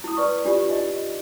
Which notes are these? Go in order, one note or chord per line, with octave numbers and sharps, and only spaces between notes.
E4 D#6
B4 D5 C#6
D4 F4 G4 D5
D#4 D#5